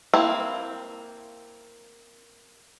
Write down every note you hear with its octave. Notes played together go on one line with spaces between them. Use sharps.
A#3 C4 E4